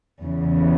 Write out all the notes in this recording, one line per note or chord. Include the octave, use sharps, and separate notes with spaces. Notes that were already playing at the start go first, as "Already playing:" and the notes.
E2 C#3 E3